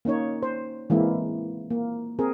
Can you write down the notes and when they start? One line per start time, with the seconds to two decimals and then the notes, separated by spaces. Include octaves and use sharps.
0.05 A#3 C#4 D#4 C#5
0.43 C5
0.90 E3 G#3 A#3 C4 E4
1.70 A#3
2.19 C4 G#4 A#4